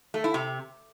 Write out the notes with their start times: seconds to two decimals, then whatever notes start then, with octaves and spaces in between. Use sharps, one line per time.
0.14 A3
0.24 E4
0.34 C3